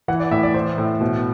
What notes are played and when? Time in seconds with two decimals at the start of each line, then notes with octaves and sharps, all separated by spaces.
0.08 E3 F#5
0.20 D5
0.31 A2 E5
0.43 D5
0.54 E3 C5
0.78 A2
1.01 B2